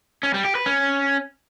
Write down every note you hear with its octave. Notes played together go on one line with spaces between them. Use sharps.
C#4
G3
G4
B4
C#4